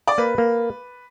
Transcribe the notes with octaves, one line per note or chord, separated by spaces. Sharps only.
D5
A#3 B4
A#3